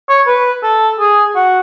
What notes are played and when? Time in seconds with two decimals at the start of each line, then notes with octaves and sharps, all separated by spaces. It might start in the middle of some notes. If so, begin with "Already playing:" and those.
0.09 C#5
0.27 B4
0.63 A4
0.99 G#4
1.35 F#4